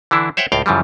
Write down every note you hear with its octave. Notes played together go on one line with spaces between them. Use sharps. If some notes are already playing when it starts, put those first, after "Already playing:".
D3 E3 D4 E4
C5 C#5 E5 F#5 G5
C#2 A2 F5 G5
F#2 C#3 E3 F3 G3